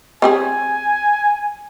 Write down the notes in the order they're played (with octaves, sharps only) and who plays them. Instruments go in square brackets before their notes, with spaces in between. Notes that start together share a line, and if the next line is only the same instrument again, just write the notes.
[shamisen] C4 G4 G#4 [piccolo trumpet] G#5